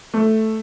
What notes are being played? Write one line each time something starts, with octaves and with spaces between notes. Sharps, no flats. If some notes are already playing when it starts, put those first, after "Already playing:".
A3